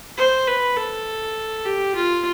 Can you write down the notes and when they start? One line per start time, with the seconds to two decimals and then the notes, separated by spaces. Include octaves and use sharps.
0.17 C5
0.47 B4
0.76 A4
1.65 G4
1.95 F4